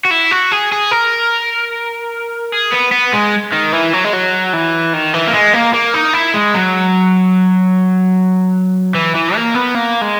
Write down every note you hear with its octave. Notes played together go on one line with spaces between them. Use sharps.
F#4
E4
F#4
G#4
G#4
A#4
G#4
B3
B3
G#3
D#3
E3
F#3
G#3
F#3
E3
D#3
E3
A#3
G#3
A#3
A#3
D#4
E4
G#3
F#3
E3
E3
A#3
B3
A#3
G#3